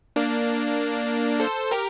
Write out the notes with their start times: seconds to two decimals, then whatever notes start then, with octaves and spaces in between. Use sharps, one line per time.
0.16 A#3 D4
1.40 A4 C5
1.71 G4 A#4